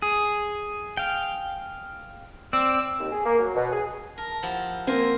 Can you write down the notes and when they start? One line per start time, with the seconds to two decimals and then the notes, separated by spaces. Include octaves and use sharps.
0.02 G#4
0.97 F5 G5
2.53 C4 D5 E6
2.99 D#2
3.12 G#4
3.25 A#3
3.40 F#3
3.55 B2
3.72 G#4
4.18 A#4 A5
4.43 F3 E4 G4 F#5
4.87 A#3 C4 A#4 C5 G#5